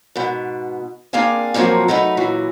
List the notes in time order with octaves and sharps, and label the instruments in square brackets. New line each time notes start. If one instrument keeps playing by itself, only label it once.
[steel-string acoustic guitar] G#2 B2
A#3 C4 D4 G#4 F5 G#5
A#2 F3 F#3 A#3 C4
F#3 A3 D#4 B4
A#2 E3 F#3